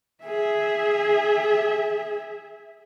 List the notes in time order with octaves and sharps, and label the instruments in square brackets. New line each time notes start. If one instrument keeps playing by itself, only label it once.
[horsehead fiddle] G#4 E5